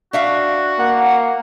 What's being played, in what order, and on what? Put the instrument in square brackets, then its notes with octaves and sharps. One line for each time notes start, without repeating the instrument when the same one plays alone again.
[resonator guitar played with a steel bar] D4 E5 F5 [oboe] F#4
[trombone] A#3 [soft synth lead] F#5